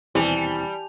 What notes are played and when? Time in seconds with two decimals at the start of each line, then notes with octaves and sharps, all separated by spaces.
0.15 D#2 B2 E3 G3 C4 G#5 A5 F7